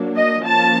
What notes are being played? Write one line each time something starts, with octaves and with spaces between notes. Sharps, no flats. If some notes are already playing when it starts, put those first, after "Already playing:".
Already playing: F#3 A#3 D4
D#5
F3 A#3 C#4 A5